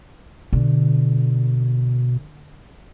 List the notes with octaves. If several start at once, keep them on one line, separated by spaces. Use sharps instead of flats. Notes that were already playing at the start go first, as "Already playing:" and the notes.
B2 D3